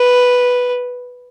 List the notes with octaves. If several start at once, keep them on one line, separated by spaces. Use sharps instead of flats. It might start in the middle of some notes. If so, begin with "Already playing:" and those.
Already playing: B4